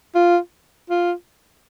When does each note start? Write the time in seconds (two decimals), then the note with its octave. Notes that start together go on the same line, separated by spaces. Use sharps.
0.15 F4
0.90 F4